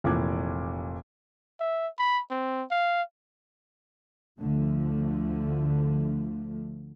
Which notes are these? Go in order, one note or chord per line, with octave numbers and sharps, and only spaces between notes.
F1 A#2 E3 D6 F#6 G#6
E5
B5
C4
F5
D2 D3 F3 A3